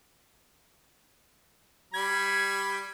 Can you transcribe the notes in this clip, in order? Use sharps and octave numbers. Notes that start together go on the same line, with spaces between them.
G3 B5 G#6